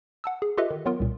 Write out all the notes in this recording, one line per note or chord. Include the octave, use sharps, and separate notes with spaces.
F#5 A5 E6
G#4
F4 G4 A4 B4 D#5 E5
D#3
F#3 B3 F4 A#4
C2 A#2